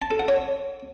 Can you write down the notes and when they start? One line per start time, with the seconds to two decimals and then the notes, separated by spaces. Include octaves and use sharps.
0.02 A5
0.11 A4
0.19 F#5
0.28 C#5